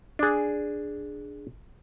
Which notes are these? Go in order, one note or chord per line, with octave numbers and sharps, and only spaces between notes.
D4 G#4